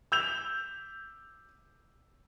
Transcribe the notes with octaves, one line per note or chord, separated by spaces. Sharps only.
E6 G6 F7